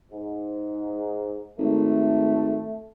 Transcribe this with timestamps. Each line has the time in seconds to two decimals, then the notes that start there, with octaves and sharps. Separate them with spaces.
0.11 G#2
1.58 G#1 A3